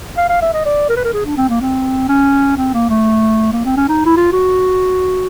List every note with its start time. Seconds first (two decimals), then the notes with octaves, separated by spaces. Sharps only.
0.17 F5
0.29 F5
0.42 E5
0.54 D#5
0.66 D5
0.90 A#4
0.97 B4
1.05 A#4
1.14 G#4
1.26 D4
1.37 C4
1.49 A#3
1.61 C4
2.09 C#4
2.58 C4
2.74 A#3
2.90 A3
3.53 A#3
3.65 C4
3.77 C#4
3.89 D#4
4.06 E4
4.17 F4
4.33 F#4